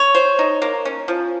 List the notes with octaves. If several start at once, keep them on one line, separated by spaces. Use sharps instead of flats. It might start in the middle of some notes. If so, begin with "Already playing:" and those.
Already playing: C#5
C5
D#4
A#3
C#4
F3